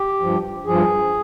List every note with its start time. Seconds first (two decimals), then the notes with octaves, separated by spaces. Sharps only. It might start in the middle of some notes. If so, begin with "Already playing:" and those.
Already playing: G4
0.20 G2 F3
0.66 G2 F3 G#4